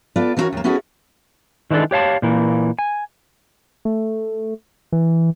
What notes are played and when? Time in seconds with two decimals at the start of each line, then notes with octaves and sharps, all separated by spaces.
0.16 B3 F4 A4 D5
0.37 E3 B3 C#4 D4 F#4 A#4
0.53 D#2 A#3
0.64 B3 C#4 E4 F#4 G#4 A4
1.71 D#3 E3 G#3 D4 A4
1.91 G4 C#5 F5 A5
2.22 A#2 E3 A#3
2.79 G#5
3.85 A3
4.92 E3